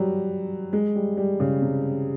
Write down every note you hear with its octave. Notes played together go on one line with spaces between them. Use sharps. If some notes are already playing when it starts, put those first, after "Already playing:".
Already playing: F#3 G3
G#3
G3
G3
C#3
C3